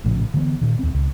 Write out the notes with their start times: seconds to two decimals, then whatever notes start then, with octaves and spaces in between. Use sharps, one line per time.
0.04 A#1 A2 C#3 F3
0.34 D3 E3 G#3 B3
0.61 A#2 D#3
0.79 D#2 C4
0.93 C#2